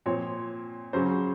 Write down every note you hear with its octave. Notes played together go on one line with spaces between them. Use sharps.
A#2 F3 C4 C#5
C#3 F#3 C#4 C5